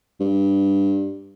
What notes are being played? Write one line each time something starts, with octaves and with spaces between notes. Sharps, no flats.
G2